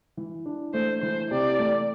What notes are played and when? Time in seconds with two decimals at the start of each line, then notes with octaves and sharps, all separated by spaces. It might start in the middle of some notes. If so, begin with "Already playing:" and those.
0.17 E3
0.46 D4
0.74 A3 C5
1.02 E3 C5
1.31 C3 D5
1.59 A3